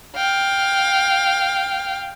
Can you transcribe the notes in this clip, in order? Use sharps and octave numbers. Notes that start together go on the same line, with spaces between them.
F5 G5